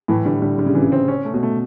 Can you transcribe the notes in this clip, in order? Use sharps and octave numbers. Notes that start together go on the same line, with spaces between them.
A2 E3
D3 G3
D3 G3
D3 G3
C#3
C3 E3
C#3
C4
C#4
A3
B2
A3